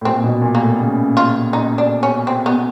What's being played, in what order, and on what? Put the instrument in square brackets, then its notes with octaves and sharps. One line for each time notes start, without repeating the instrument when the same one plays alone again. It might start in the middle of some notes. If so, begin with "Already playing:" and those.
[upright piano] A2
[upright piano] A#2 [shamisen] C4
[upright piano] B2
A#2
[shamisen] A#3
[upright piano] A2
C#3
[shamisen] F4
D#4
D4
C#4
C4
B3